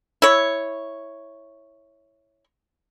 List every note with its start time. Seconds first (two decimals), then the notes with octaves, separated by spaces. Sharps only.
0.22 E4 C#5